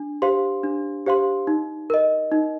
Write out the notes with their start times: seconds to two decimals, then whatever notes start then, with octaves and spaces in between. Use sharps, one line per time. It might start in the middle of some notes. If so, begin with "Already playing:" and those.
Already playing: D4
0.22 G4 C5 F5 C6
0.64 D4
1.06 G4 C5 F5 C6
1.47 D#4
1.90 A#4 D#5
2.32 D#4